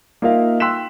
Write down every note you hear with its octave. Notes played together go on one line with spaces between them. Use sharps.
A#3 D#4 F4 A#4 E5 F5
G5 C6 E6 F#6 B6 E7